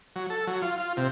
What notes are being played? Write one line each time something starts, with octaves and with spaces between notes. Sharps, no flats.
F#3
A4
F#3
F4
F4
C3